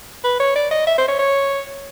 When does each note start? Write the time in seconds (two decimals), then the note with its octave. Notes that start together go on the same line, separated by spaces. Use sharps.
0.24 B4
0.40 C#5
0.56 D5
0.71 D#5
0.87 E5
0.98 C5
1.08 C#5
1.19 C#5